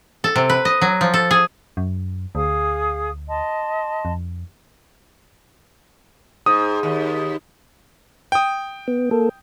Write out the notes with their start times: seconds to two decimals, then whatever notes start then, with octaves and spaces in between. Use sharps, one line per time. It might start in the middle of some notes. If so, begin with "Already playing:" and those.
0.24 A4
0.36 C3
0.50 B4
0.65 D#5
0.82 F#3
1.01 F3
1.14 A4
1.31 G#4
1.77 F#2
2.35 D2 G#4 F5 D#6
3.29 D#5 A5 C6
4.05 F2
6.46 G#2 D#6
6.83 D#2
8.32 G5 D#6
8.88 B3
9.11 A#3 A4